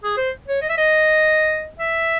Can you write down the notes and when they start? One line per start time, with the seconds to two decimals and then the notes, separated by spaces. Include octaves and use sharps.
0.04 G#4
0.17 C5
0.48 C#5
0.61 D#5
0.69 E5
0.77 D#5
1.79 E5